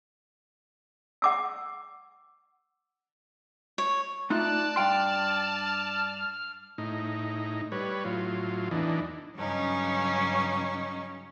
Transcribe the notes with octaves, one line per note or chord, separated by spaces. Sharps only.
F#5 D6 E6
C#5
A3 D#4 F4 D5 A5 F#6
G2 G5 C6 F6
A2 D#4
G3 B4 C#5
A2 F#3 F4
E2 E3 D4 D#4
G2 C#3 F#3 C#4 D#4 C#6